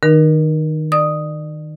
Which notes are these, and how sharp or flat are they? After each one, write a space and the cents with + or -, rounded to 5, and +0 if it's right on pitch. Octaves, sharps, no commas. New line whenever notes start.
D#3 -5 D#4 -30 A#4 +25
D5 +35 D#6 +0